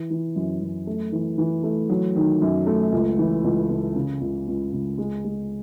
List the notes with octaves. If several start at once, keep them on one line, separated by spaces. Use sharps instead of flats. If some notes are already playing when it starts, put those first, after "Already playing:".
Already playing: E3
E3
F#2
F#2
A3
E3
E3
A3
F#3
D#3
F#2
A3
C#2
E3
C#2
C#2
C#3
C#2
C#2
C#2
G#3
G#3